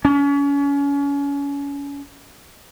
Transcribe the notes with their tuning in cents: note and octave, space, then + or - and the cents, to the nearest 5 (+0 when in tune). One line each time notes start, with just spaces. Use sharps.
C#4 +30